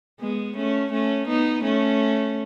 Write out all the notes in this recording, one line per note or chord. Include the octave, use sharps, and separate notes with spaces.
G#3 B3
A3 C#4
A3 C#4
B3 D#4
A3 C#4